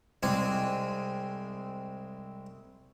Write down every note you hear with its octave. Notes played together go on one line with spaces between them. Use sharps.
C2 G#3 C4 G#5 D6